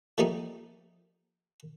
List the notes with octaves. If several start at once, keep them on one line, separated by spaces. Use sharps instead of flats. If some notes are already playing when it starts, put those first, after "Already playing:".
F3 G3 A3 A#3 D#4 G4